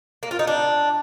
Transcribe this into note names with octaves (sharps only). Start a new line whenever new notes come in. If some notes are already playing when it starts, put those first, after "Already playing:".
A#3
F4
D#4
D4